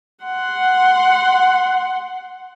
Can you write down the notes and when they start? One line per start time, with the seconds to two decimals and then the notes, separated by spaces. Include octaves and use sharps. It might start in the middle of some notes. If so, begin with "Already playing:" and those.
0.24 F#5 C6